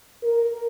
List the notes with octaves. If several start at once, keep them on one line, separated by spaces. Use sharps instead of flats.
A#4